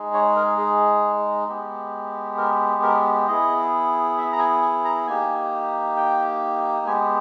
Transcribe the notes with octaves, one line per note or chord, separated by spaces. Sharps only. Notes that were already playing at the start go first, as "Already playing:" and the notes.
Already playing: G#3 D#4 G#4
C#5
A#4
G#4
G#3 B3 G4
A#4
A#4
B3 E4 G#4 D#5
E5
A#5
G#5
G#5
A#5
A#3 D#4 G4 G#5
G5
G#3 B3 G4 G#5